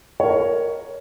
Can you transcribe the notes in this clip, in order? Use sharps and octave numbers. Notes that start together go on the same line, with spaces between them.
A#4 C#5